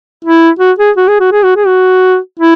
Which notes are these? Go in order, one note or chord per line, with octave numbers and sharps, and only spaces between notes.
E4
F#4
G#4
F#4
G#4
F#4
G#4
F#4
G#4
F#4
E4